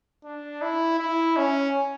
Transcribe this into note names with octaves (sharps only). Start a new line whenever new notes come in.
D4
E4
E4
C#4